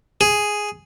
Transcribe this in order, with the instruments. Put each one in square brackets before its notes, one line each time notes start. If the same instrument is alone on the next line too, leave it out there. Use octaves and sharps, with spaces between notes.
[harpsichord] G#4